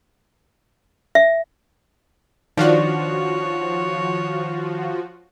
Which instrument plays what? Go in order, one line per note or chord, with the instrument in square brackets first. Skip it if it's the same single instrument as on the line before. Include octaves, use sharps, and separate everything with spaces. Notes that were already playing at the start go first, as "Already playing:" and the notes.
[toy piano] E5
[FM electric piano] D#3 [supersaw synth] F3 F4 F#4 [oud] D4 [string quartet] C#5